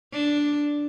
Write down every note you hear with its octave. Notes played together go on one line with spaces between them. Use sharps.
D4